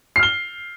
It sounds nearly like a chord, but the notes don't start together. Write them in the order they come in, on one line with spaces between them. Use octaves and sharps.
C7 F6 G7